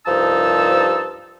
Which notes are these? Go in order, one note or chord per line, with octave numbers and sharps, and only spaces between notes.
C2 G2 F3 D#4 A5 E6